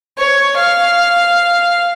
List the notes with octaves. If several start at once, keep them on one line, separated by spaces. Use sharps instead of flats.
C#5
F5